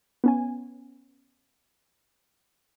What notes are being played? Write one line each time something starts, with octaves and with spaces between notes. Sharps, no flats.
B3 C#4 G#5